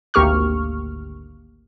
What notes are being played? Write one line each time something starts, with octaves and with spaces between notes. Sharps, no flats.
G#1 D2 A#3 G4 C#6 F6